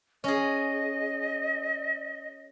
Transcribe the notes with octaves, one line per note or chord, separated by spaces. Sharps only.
C#4 G#4 D#5